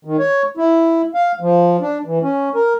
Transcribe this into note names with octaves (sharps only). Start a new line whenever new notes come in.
D#3
C#5
E4
F5
F3
D4
E3
C#4
A#4